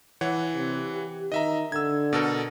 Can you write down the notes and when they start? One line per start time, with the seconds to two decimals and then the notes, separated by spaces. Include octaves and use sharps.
0.21 E3 C#5 F#5
0.55 C3
0.92 G4
1.32 D#3 D#5 E5 A#5
1.72 D3 E6 G#6
2.13 B2 A4 A#4